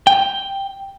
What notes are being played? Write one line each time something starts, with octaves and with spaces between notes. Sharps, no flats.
G5